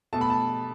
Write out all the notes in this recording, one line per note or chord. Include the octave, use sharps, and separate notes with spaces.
B2 A3 A5
B5
A5